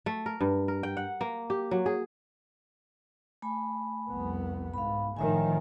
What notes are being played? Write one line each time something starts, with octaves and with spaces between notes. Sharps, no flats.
A3
A#4
G2
A#4
G5
F#5
A#3
G4
F#3
G#4
A3 G#5 B5
C2 F2 B3
G#2 F5 B5
A2 D#3 F3 C#5 E5 G#5